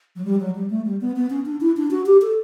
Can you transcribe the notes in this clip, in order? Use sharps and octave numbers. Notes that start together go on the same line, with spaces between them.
F#3
G3
F#3
G3
A3
G3
B3
B3
C#4
D4
E4
D4
F#4
G4
A4